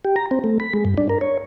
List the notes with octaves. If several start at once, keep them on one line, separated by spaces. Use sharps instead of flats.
G4
A#5
C4
A3
B5
G#3
G2
D4
A#4
C#5